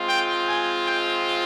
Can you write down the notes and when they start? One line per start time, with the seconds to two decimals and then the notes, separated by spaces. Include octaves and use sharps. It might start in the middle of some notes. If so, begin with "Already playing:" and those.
Already playing: G#3 C4 F4
0.09 G5
0.48 G#5
0.87 G5